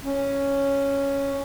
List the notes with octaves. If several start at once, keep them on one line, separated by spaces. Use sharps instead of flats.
C#4